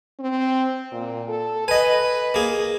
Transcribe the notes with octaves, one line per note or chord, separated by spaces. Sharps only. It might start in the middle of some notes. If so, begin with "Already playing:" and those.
C4
A#2
A4
B4 D#5 G#5
A#3 G#4